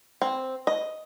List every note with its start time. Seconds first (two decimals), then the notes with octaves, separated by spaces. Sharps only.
0.22 C4
0.67 D#5